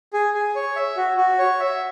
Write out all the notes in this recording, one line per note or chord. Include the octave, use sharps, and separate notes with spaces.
G#4
G#4
C#5
E5
F#4
F#4
C#5
E5